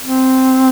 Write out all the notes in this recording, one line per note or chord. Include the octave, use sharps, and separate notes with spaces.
C4